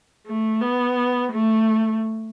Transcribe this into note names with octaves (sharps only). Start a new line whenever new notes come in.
A3
B3
A3